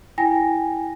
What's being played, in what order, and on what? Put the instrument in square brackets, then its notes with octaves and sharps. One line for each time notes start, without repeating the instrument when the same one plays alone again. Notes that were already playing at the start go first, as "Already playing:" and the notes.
[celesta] E4 G5 G#5 A#6